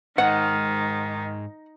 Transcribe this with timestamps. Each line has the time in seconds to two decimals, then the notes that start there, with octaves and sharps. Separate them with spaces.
0.18 G#2 D#3 F#5